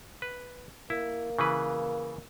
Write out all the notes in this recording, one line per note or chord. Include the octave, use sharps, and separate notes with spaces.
B4
A#3 E4
C#3 E3 B4